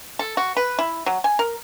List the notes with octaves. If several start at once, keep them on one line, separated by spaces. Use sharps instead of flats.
A4
F#4
B4
E4
F#3
G#5
A#4